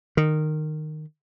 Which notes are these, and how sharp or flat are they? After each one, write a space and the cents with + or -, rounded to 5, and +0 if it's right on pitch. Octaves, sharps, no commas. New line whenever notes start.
D#3 -15